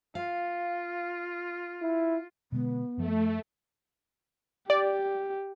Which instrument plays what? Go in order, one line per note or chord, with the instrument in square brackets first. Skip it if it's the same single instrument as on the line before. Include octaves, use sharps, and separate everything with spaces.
[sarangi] F4 [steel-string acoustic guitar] F5
[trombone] E4
[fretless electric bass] B2 D3 G#3 [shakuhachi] B3
[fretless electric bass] F#2 F3 [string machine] A3
[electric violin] G4 [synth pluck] D5